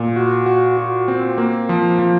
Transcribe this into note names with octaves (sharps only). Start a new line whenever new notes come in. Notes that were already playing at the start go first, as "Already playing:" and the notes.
Already playing: A#2
F#4
F#4
F#4
C4
A#3
F3
F3